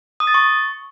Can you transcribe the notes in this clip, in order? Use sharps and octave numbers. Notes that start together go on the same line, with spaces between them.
D#6
A6
C#6